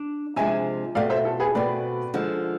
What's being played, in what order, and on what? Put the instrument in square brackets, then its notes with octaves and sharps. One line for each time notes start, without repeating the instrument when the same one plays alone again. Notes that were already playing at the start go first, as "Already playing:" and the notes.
Already playing: [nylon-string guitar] D4
[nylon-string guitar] C3 F3 G#3 D4 [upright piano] E5 G#5
[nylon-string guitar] B2 A3 C4 [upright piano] D5 F5
[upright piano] C5 E5
A4
G#4 B4
[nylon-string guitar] B2 A3 C4 [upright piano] B4 D5
[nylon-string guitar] D3 F3 G#3